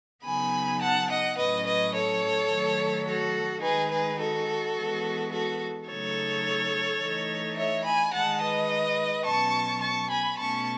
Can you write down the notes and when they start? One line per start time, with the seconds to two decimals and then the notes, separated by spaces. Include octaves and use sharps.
0.25 C#3 F#3 B3 D#4 G#5 B5
0.81 F#5 A5
1.10 D#5 F#5
1.37 A2 F#3 C#4 B4 D#5
1.65 B4 D#5
1.95 A4 C#5
2.50 D#3 F#3 A3
3.07 F#4 A4
3.63 D#3 G#3 D#4 G#4 B4
3.91 G#4 B4
4.19 F#4 A4
4.76 E3 G#3 B3
5.32 F#4 A4
5.87 C#3 F#3 A3 D#4 A4 C#5
7.01 E3 A3 D#4
7.57 C#5 E5
7.85 G#5 B5
8.13 D#3 G#3 D#4 F#5 A5
8.41 B4 D#5
9.26 B2 F#3 C#4 A5 C#6
9.81 A5 C#6
10.10 G#5 B5
10.37 B2 A3 C#4 A5 C#6